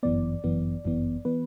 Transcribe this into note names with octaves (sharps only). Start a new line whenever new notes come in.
G1 F#2 E3 B3 D5
G1 F#2 E3 B3
G1 F#2 E3 B3
E3 B3 B4